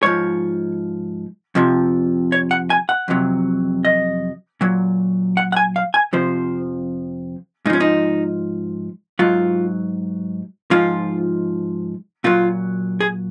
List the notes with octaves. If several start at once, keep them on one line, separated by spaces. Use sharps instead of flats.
G#2 F3 C#5
F2 C3 F3
C#5
F#5
G#5
F#5
F2 C3 F#3
D#5
A#2 F#3
F#5
F#5
G#5
F5
G#5
F2 C3 F3 C5
G#2 F3 C#4 D#4
D#4
G#2 F#3 F4
G#2 F3 F4
A#2 F#3 F4
G#4